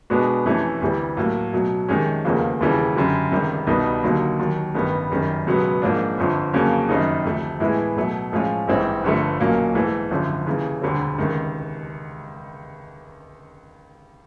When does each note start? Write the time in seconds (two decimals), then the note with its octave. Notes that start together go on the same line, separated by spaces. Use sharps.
0.10 B2 G#3 B3 D4 F#4
0.46 F2 C3 E3 A3 C#4
0.81 D2 C3 E3 G3
1.17 A2 F#3 A#3
1.53 B2 F#3 A3
1.88 F2 C3 D#3 G#3 C#4
2.25 F1 E2 C#3 F3 A#3
2.60 E1 D#2 C#3 E3 G3
2.96 F#2 D3 G3
3.31 C#2 C3 D#3 G3
3.67 C2 B2 G3 B3 D#4
4.03 D#2 D3 F#3 A#3 D#4
4.39 D#2 D#3 F#3
4.75 A1 G2 D#3 G3 B3
5.10 F#1 F#2 D#3 G3
5.47 C#2 B2 F#3 B3
5.82 G#2 F3 A#3 D4
6.18 G1 F2 D3 F3
6.53 F2 C#3 F#3 A#3 C#4
6.89 F#2 D#3 G3 C4 D#4
7.25 D2 C3 F3 A3
7.60 A2 E3 G#3 B3 E4
7.96 B2 F#3 A3
8.32 A2 F3 G#3 C#4 F4
8.68 A#1 G#2 E3 G3 C4
9.04 G1 G2 D3 F3 A3
9.39 B1 A#2 F#3 A#3 C#4
9.75 G#2 E3 A3
10.10 G#1 F#2 D3 F3
10.46 D#2 C#3 E3
10.82 E1 D2 D3 G3 C4
11.18 C#2 C3 D#3